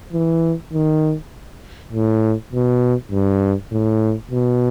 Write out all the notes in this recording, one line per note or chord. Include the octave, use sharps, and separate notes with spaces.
E3
D#3
A2
B2
G2
A2
B2